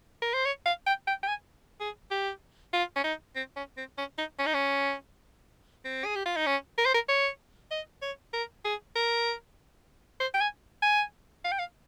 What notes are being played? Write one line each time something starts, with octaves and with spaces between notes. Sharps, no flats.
A#4
C5
C#5
F5
G5
G5
G5
G#5
G#4
G4
F4
C#4
D#4
C4
C#4
C4
C#4
D#4
C#4
D#4
C#4
C4
G#4
G4
F4
D#4
C#4
A#4
C5
A#4
C#5
D#5
C#5
A#4
G#4
A#4
C5
G5
G#5
G#5
F5
G5
F5